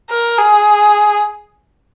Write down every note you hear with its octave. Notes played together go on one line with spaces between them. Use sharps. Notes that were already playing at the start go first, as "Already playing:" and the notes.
A#4
G#4